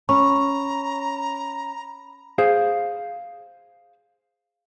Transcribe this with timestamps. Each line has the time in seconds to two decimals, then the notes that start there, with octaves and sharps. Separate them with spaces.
0.09 C#4 A#5 B5 C#6
2.38 G#4 C5 F5